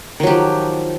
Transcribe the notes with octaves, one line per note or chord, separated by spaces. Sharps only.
D#3 F3 F#3 G4